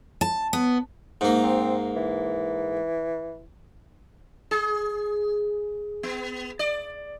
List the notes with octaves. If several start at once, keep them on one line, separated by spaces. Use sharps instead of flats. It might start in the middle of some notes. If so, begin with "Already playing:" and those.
A5
B3
G#2 A#3
C4
E3
G#4
B3
D5